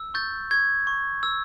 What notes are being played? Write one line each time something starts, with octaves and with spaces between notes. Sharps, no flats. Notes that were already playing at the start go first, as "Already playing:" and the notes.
Already playing: E6
C#6 G6 A6
C#6 G#6
C#6
E6